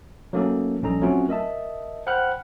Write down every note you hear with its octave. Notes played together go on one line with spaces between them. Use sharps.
F#3 A3 A#3 C#4 D#4 A4
A#1 G3 C#4 D#4 A4 A#5
F#3 A3 C4 C#4 F4 F#4
A#4 D#5 E5 A5
C5 F#5 G5 B5 F6 F#6